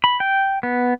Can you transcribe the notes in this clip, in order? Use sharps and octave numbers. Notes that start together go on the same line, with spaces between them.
B5
G5
B3